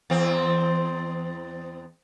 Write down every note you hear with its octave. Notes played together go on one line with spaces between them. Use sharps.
E2 C4